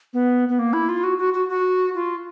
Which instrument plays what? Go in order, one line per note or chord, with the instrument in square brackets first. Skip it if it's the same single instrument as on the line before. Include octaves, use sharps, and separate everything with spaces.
[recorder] B3
B3
A#3
E4
F4
F#4
F#4
F#4
F#4
F4